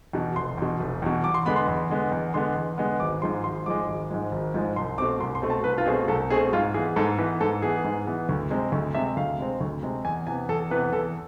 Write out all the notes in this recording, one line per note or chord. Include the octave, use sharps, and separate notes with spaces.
E2 B2
F1 C6
E2 B2
F1
E2 B2
E2 D6
C6
D3 G#3 B3 B5
C6
E2
D3 G#3 B3
E2
D3 G#3 B3 C6
E2
D3 G#3 B3
G#1 D6
G#2 F3 G#3 C6
G#1 C6
G#2 F3 G#3 D6
G#1
G#2 F3 G#3
G#1
G#2 F3 G#3
C2 C6
B2 A3 C4 D6
C2 C6
C6
B2 A3 C4
A5
C2 B4
F4
B2 A3 C4 G#4
C2 A4
B2 A3 C4 G#4
G#2 F4
E3 B3 G#4
G#2 A4
E3 B3 B4
G#2 A4
E3 B3 G#4
G#2
E3 B3
D2
C3 G#3 C4
D2
C3 G#3 C4 E5
D2 F5
C3 G#3 C4
D2
C3 G#3 C4
E2 G#5
C3 E3 B3 G#5
E2 A4
C3 E3 B3 B4
E2 A4